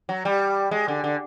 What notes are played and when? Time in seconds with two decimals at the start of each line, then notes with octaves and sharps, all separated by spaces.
0.09 F#3
0.25 G3
0.71 G#3
0.88 D3
1.04 D3